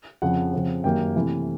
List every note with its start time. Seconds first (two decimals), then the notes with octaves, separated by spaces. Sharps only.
0.22 F2 C#3 F3 F#5
0.53 F2 C#3 F3
0.84 F#2 D#3 G3 A#3 G5
1.16 C3 E3 A3